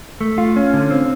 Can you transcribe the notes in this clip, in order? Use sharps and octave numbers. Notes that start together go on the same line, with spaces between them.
A3
F4
C#4
D3
C4